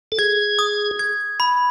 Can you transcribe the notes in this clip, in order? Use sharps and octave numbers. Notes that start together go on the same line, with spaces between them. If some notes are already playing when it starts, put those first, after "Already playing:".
A4
G#4 G#6
D#6
G#6
B5